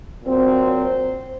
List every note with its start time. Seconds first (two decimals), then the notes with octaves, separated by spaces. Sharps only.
0.23 A#2 F#3 C4
0.68 C5